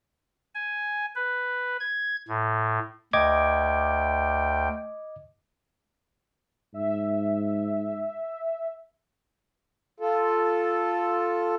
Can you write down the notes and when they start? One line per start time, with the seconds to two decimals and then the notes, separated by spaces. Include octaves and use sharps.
0.54 G#5
1.16 B4
1.80 G#6
2.28 A2
3.13 D2 D#5 G5 D6 G#6
6.74 G#2 E5
10.00 F4 A4